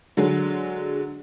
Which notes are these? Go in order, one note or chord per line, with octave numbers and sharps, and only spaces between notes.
D3 F#3 G#3